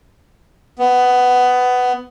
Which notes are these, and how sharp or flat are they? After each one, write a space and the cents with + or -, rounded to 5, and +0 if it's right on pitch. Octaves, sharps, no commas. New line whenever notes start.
B3 +15